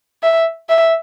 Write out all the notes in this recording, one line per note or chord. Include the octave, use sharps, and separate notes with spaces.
E5
E5